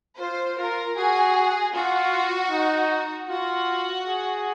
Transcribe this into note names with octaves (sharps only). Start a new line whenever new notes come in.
F4 C5
F4 A#4
F#4 G#4
F4 F#4
D#4
F4 F#4
G#4